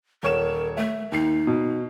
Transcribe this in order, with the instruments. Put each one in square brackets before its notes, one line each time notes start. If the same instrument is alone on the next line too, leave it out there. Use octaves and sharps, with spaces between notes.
[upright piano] D#1 C#5 E7 [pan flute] A#4
[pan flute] A3 [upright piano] E5
[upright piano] D#2 C7 [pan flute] D#4
[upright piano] B2